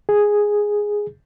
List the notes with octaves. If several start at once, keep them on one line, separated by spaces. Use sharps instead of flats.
G#4